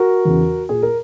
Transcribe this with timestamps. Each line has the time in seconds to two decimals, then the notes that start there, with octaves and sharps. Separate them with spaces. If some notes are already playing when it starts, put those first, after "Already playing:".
Already playing: F#4 A#4
0.25 E2 C#3 E3
0.69 A#2 G#4
0.83 A#4